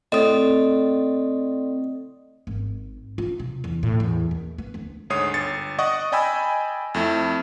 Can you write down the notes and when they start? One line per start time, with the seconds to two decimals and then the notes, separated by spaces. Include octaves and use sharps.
0.12 A2 C4 A4 D5 D#5 D#6
2.47 G#1
3.18 F4
3.39 C3
3.64 E2
3.83 A2
4.00 E2
4.31 D#2
4.58 B3
4.74 D2
5.10 D2 G#2 C#5 D#6 C7
5.34 G1 A6 C#7
5.79 D5 D#5 F#5 C#6 D#6
6.12 D5 D#5 G5 G#5 B5 E6
6.94 F2 A3 E4